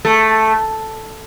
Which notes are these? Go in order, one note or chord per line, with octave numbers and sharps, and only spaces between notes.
A3